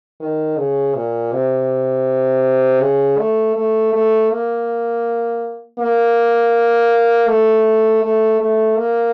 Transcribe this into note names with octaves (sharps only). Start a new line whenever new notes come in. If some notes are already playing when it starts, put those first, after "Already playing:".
D#3
C#3
A#2
C3
C#3
A3
A3
A3
A#3
A#3
A3
A3
A3
A#3